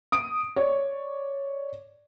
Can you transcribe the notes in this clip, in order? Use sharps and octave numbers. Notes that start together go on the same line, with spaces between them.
D#6 D7
C#5 D5